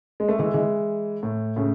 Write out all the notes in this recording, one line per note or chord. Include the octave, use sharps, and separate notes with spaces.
G#3
A3
E3 G#3
E3 G#3
A2
A2 C#3